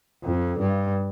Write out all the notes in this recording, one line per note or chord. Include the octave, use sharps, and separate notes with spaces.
F2
G2